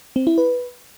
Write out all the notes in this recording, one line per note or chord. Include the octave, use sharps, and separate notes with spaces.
C4
E4
B4